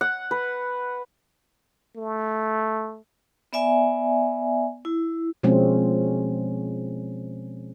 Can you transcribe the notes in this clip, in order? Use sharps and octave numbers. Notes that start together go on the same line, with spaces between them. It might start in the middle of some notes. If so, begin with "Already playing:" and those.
F#5
B4
A3
B3 D5 E5 G#5
E4
B2 F3 G#3 C4 C#4